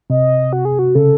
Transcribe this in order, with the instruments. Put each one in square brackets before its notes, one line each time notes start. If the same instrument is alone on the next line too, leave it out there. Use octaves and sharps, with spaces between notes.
[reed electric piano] C3 [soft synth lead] D#5
[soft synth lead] F#4
G#4
F#4
[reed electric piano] C#3 [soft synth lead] A4